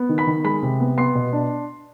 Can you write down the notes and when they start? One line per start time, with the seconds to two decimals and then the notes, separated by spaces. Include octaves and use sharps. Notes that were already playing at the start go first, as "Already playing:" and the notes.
Already playing: B3
0.09 D#3
0.18 B5 B6
0.27 D#3
0.44 G#3 B5 B6
0.62 C3
0.80 B3
0.97 B3 C6 C7
1.15 B2
1.33 D4